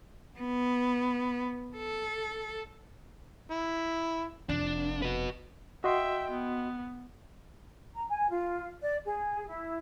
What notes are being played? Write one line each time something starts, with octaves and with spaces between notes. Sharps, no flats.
B3
A4
E4
F1 D4
F#4 B4
F#4 D#5 E5 G5 C6
B3
A#5
G#5
F4
D5
G#4
E4